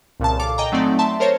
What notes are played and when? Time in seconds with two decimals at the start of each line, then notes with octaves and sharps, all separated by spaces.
0.20 C2 A#2 C#3 A5
0.39 A4 F5 D6
0.58 D#5 G5 G#5 A#5
0.72 F#3 A3 C4 D#4 D5
0.99 E5 A5 C6
1.20 A#4 C5 C#5 A6